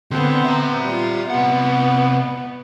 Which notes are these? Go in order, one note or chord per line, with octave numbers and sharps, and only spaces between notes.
D3 B3 C4
E5 A#5
G3 F4
C3 B3 F#5